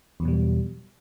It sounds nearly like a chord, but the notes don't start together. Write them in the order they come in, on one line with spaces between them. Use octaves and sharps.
E2 F#3 B2 G3